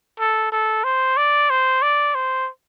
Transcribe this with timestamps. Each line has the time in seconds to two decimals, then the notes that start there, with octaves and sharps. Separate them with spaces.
0.20 A4
0.52 A4
0.84 C5
1.17 D5
1.50 C5
1.82 D5
2.15 C5